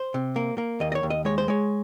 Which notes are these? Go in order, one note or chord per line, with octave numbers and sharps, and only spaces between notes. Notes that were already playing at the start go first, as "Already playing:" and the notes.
Already playing: C5
C3
A#3
A#3
D#2 D#5
D#5
C#5
D#2
D#5
G#3 C#5
C5
G#3 C#5